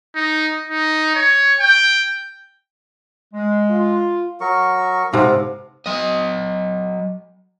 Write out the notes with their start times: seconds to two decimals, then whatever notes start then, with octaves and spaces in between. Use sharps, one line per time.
0.15 D#4
0.68 D#4
1.15 C#5
1.60 G5
3.34 G#3
3.70 F4
4.41 F#3 A#4 C#6
5.13 G#2 C3 B3 A4 F5
5.86 F#3 D#5